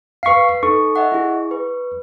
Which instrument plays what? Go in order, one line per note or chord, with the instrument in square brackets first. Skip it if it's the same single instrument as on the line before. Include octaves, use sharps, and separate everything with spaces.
[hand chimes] B4 B6 C7 [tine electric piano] F5 C#6
[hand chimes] D#4 A4 [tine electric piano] C#6
[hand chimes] D#5 E5 F#5
E4 G#4
B4